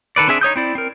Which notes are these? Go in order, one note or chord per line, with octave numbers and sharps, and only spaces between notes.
D#3 A4 B4 D5
C4 D4 G#4 E5 G#5
D#4 C#5 D#6 G6
C4 E4 D5
C4 A#4